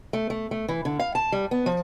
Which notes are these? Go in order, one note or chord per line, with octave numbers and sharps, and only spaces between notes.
A3
A3
A3
E3
D3
F5
A5
G3
B3
F3